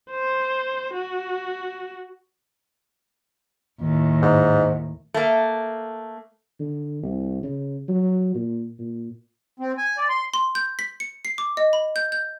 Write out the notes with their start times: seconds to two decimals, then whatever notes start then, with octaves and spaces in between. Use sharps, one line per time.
0.11 C5
0.94 F#4
3.81 D#2 A2
4.22 G#2
5.14 A3 A#3
6.60 D3
7.03 C2
7.43 C#3
7.88 F#3
8.35 A#2
8.79 A#2
9.60 C4
9.78 G#5
9.98 D5
10.09 C6
10.34 C6
10.55 G6
10.79 B6
11.00 C#7
11.25 C7
11.38 D6
11.57 D#5
11.73 B5
11.96 G6
12.12 G6